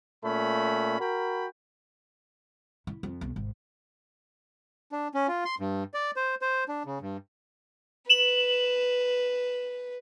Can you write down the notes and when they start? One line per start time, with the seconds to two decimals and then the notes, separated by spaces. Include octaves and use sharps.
0.24 A#2 A3 C#4 B5
1.00 F#4 A#4 G5 B5
2.87 E4
3.03 F2
3.21 B1
3.36 G#1
4.92 D4
5.14 C#4
5.28 F4
5.45 C6
5.59 G2
5.94 D5
6.16 C5
6.42 C5
6.69 D4
6.86 C#3
7.01 G2
8.09 B4 E7 F#7